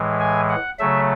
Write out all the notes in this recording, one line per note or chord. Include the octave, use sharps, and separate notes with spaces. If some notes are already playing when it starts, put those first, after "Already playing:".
Already playing: A2 E3 G#3
G#5
F#5
C#3 F#3 A3 E5